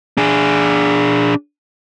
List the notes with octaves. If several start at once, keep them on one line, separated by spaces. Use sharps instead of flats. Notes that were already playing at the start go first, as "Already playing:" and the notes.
D4 G#4